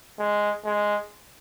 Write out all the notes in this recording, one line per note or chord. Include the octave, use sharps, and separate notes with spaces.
G#3
G#3